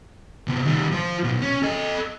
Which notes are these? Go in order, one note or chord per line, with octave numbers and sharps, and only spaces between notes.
C3 B3
D#3 G3
F3 C5
B2 F#3
C#4
A4 D#5